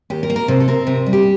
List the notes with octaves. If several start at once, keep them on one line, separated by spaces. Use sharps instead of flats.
D#2 G4
A#4
A#3
A#4
C3 C5
A4
C4 A#4
C3 A#4
G3
G4